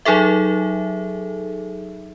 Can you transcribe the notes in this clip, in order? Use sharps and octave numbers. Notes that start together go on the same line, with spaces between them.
F#3 D#4 G#4 A4 E5